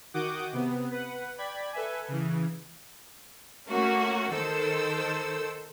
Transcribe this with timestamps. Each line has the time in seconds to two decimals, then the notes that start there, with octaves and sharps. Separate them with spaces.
0.14 D#3 F#4 F#5 D6 D#6 G6
0.52 C3 B3
0.91 B4 F#5
1.38 D5 G5 B5 G#6
1.73 A4 B4 E5 G#5
2.08 C#3 E3
3.69 A3 A#3 C#4 F#4
4.32 D#3 A4 C5 E6